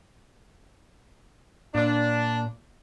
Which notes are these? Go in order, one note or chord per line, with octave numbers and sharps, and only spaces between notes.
A#2 D4